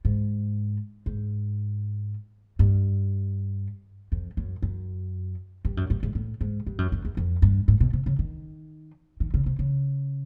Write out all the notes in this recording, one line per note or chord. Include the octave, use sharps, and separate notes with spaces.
G#2
G#2
G2
F2
F#2
F#2
G2
F#2
G2
G#2
A2
G#2
G2
F#2
F#2
E2
F2
G2
G#2
B2
C3
C#3
D#3
D#3
C#3
C3
C#3